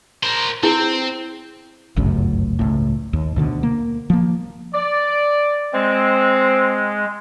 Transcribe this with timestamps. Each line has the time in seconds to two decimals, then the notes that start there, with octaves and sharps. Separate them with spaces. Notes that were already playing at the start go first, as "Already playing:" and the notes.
0.23 A#4 C5
0.63 C4 E4 G#4
1.97 G1 C#2 F#2 A2
2.59 C#2 A2
3.13 D#2
3.36 D2 B2 D3
3.63 A#3
4.10 F3 A#3
4.74 D5
5.74 G#3 C4